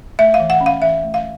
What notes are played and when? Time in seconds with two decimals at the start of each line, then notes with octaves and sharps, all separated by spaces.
0.19 A3 E5
0.34 F5
0.40 E3
0.50 F#5
0.61 C#4
0.66 F5
0.82 E3 E5
1.04 A3
1.14 F5